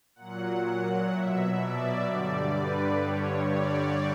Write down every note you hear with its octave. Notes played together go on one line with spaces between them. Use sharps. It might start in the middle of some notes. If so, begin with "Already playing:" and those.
A#2 F#3 F#5
B2 F#3 E5
D5
G2 D3 G3
B4
G2 D3 G3 C#5
D5